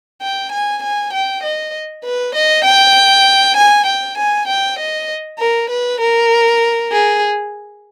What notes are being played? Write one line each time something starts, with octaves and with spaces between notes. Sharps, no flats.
G5
G#5
G#5
G5
D#5
B4
D#5
G5
G#5
G5
G#5
G5
D#5
A#4
B4
A#4
G#4